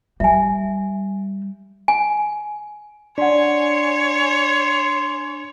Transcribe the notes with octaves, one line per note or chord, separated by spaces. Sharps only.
G3 E5 G#5
G#5
D4 C#5 D5 F#5 G#5 C6